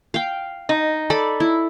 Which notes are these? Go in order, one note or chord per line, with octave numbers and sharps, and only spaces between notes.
F5 G5
D#4
A4 D5 B5
E4